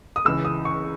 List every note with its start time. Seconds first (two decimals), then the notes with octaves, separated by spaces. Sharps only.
0.16 D#6
0.25 C#2 C#3 E3 E6
0.45 D#6
0.65 C#6